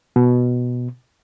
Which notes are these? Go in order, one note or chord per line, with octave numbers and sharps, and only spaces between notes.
B2